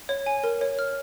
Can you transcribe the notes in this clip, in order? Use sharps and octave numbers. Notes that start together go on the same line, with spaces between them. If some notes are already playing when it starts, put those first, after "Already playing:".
C#5
G#5
A#4
C#5
F6